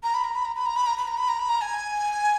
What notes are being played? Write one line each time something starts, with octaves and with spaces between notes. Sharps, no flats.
A#5
B5
A#5
B5
A#5
B5
A#5
B5
A#5
B5
A#5
B5
A#5
B5
A#5
G#5